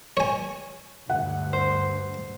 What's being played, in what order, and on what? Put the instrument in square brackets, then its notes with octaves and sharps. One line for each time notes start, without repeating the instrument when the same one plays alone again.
[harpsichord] C#5 G#5
[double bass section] D2 G2 [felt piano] F#5
[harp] C5